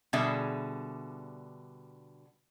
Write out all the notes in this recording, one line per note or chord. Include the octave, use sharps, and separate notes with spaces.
B2 D3 G3 G#4 E5